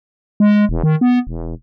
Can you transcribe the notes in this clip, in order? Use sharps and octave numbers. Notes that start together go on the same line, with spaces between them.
G#3
E1
D#3
B3
E1